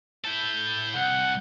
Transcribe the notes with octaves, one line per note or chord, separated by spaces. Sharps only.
E4 A4 G6
C2 F#5